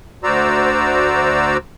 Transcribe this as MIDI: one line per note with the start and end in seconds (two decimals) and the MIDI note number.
0.24 1.57 38
0.24 1.57 66
0.24 1.57 72
0.24 1.57 74
0.24 1.57 82
0.24 1.57 88